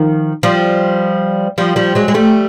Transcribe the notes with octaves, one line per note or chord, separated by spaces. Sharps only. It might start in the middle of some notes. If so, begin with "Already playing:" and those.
Already playing: D#3 F3
F3 G3
F3 G3
F3 G3
F#3 G#3
G#3
G3 A3